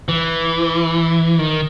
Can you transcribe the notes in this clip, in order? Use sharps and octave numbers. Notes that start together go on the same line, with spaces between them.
E3
D#3